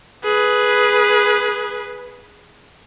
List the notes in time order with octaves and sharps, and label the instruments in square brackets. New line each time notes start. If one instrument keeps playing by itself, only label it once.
[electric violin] G#4 B4